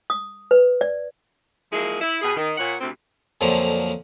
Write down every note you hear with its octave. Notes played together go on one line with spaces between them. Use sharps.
D#6
B4
D5
F3 F#3 G#3 A#3 E4 G#4
E4
B2 B3 G4 G#4
D#3
A#2 C#5 F#5
D2 C3 C4
F2 A#2 D3 F3 F#3